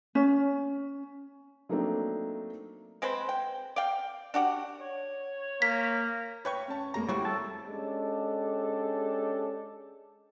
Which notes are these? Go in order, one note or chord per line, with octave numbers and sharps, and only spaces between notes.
C#4
F#3 A3 A#3 C4 D4 D#4
G#3 C4 B4 C5
G5
D5 F5 G5
D4 F#4 G4 F#5
C#5
A#3 B6
B4 C#5 G5 C#6
C#4 A5
F1 G#3 A#3 A#5
G3 C4 E4 F#4 C#5
A4 A5
G#3 C#4 D4 G4 A4